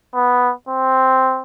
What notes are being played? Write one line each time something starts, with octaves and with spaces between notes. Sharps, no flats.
B3
C4